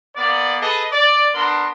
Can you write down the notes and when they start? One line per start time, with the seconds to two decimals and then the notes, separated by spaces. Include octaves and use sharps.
0.16 A#3 B3 D5
0.61 G#4 A4 B4 D#5
0.91 D5
1.35 B3 D4 A#4 C6